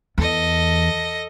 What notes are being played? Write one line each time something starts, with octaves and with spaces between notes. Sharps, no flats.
E2 A4 D#5